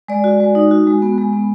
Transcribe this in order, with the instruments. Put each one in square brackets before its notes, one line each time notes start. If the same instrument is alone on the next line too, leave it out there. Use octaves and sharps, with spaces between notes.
[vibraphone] G#3 D5
F#4
G#3
D#4
F#4
G#3
B3
G#3
B3